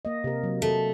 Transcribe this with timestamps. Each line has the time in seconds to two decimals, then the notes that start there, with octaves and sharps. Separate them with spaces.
0.05 A#3 D#5
0.24 C3 A#4
0.43 F#3
0.62 A3